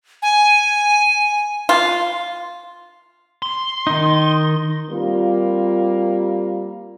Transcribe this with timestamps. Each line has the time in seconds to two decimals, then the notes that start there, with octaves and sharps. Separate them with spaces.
0.22 G#5
1.69 F4
3.42 C6
3.87 D#3 D#4
4.90 G3 A#3 C4 F4